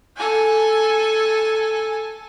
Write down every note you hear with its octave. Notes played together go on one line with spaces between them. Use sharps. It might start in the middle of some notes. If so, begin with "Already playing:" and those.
A4 G#5